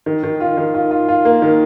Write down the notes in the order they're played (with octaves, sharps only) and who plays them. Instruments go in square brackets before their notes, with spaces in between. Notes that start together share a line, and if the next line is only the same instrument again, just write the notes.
[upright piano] D#3
D#3
F4
D#3
F4
F4
F4
A#3
D#3